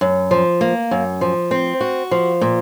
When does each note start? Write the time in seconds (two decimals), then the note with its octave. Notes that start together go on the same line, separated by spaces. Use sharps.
0.01 F#2
0.31 F3
0.61 A#3
0.91 F#2
1.21 F3
1.51 C4
1.81 F#4
2.11 F3
2.41 A#2